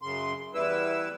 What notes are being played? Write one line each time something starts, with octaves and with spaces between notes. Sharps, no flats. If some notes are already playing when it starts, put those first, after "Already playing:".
F#2 C#3 C6
E2 G3 E4 B4 E6